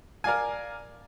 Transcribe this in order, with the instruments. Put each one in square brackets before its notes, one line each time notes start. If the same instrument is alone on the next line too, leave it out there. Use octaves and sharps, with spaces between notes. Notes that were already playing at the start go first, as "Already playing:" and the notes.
[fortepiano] A#4 D5 F5 G#5